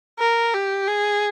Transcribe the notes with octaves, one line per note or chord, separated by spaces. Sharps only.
A#4
G4
G#4